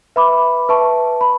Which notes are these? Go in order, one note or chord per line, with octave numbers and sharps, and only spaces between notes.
B4 E5 B5 D6
B4 E5 A5 C#6
B5